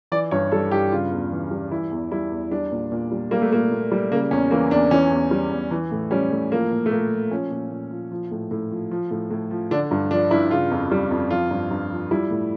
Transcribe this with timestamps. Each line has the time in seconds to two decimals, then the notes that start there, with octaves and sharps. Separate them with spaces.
0.12 E3 D5
0.31 G2 C#5
0.52 G3 A4
0.71 G2 G4
0.92 C#3 F4
1.12 E2
1.32 E3
1.51 G3
1.71 E3 E4
1.91 E2
2.11 G3 E4
2.32 E2
2.51 G3 D4
2.72 A#2
2.92 A#2
3.12 G3
3.31 G3 A#3
3.42 A3
3.52 A#2 A#3
3.71 A#2
3.92 G3
4.11 C#3 A#3
4.31 E2 C#4
4.51 E3 A#3
4.71 E2 D4
4.91 E3 C#4
5.11 E2
5.31 G3
5.51 E2
5.71 E3
5.92 A2
6.11 G3 C#4
6.31 A2
6.51 F3 A#3
6.71 A#2
6.86 A3
6.91 A#2 A#3
7.11 F3
7.31 F3 C#4
7.51 A#2
7.71 A#2
7.91 F3
8.11 F3
8.31 A2
8.51 A2
8.71 F3
8.91 F3
9.11 A2
9.31 A2
9.51 F3
9.71 D3 D4
9.91 G2
10.11 F3 D4
10.31 G2 E4
10.51 C#3 F4
10.71 F2
10.91 G3
11.11 F2
11.31 F3 F4
11.51 G2
11.71 G2
11.91 F3
12.11 G3 E4
12.31 A2